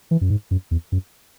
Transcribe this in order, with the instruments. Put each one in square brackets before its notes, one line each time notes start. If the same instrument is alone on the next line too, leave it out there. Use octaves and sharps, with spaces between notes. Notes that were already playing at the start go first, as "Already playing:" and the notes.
[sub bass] E3
F#2
G#2
F#2
E2
F#2